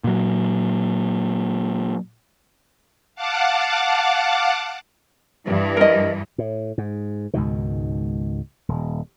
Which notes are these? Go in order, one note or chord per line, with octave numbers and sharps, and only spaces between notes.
A#2 F#3
F5 F#5 A5 D6
G2 E3
A#4 D#5
A2
G#2
C#2 G#2 B2 D#3
D#1